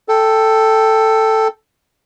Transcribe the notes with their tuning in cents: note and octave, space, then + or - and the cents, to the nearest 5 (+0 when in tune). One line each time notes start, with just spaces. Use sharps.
A4 +5 G5 +5